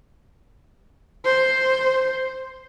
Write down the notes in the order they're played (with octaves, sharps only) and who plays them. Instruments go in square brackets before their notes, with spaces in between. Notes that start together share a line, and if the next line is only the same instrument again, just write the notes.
[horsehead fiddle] C5